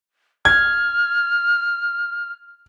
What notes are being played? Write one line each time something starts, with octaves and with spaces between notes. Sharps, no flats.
F6 G#6